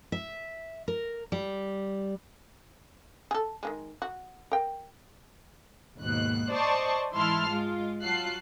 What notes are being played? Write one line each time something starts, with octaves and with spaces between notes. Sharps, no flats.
E5
A#4
G3
G#4 A4
D#3 E3 G#3
F#4
A#4 G5
D#2 G#2 B2 F#6
C5 D5 D#5 A5 C6 C#6
G#2 E3 E4 A5 C6 F6
G#3 F4
F#3 F4 A5 F#6 C7